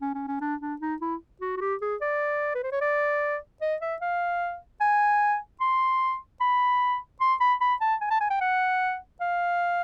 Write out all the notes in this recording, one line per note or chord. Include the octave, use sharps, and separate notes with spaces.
C#4
C#4
C#4
D4
D4
D#4
E4
F#4
F#4
G4
G#4
D5
B4
C5
C#5
D5
D#5
E5
F5
G#5
C6
B5
C6
B5
B5
A5
G#5
A5
G#5
G5
F#5
F5